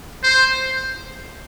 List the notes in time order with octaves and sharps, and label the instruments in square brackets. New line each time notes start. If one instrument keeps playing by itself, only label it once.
[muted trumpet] C5